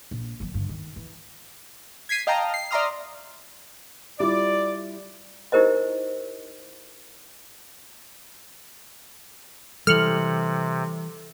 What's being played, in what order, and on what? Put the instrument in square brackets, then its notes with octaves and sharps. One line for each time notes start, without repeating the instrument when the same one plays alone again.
[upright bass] A#1
D#3 F#3
G2 D3
D#3
E3
[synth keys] G#6 B6 C7 D#7
D#5 F5 G5 A5 A#5
C7
D5 E5 A#5 C6 D#6 F6
[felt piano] G3 E4 F4 [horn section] D5
[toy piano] D#4 E4 G4 A#4 C5 D#5
[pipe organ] C3 [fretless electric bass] E3 G3 [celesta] A4 C#7 F#7 [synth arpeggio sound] F6